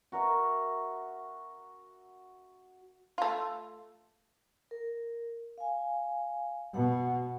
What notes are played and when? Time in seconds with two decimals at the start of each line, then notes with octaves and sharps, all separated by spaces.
0.12 F#4 A#4 E5
3.18 A3 F4
4.71 A#4
5.58 F5 G#5
6.74 B2 F#5